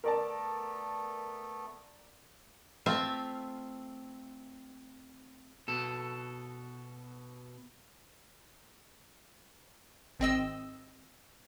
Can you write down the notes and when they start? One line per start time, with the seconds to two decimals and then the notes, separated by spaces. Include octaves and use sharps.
0.04 A3 B3 A4 A#4 D5 A5
2.86 A3 C4 F4 E5 F5
5.68 B2 A4
10.20 G#1 C4 D#5 E6